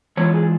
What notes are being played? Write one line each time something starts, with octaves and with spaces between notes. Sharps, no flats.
E3 G#3 C4 F4 C#5
G#4